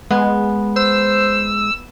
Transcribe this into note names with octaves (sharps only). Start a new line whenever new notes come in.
G#3 B3
C5 E6